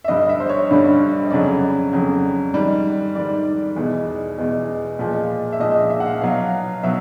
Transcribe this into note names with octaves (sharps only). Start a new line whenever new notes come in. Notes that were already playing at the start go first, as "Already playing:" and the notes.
E5
G2 D3 G3 D#5
E5
C5
C#5
G2 D3 G3
D#5
F2 C#3 F#3 D5
F2 C#3 F#3
G#2 D#3 G3
G#2 D#3 G3 D5
E2 B2 G#3
E2 B2 G#3
A#2 F3 G#3
E5
A#2 F3 G#3 D#5
D#5
E5
F#5
F5
B2 F#3 F5
B2 F#3 E5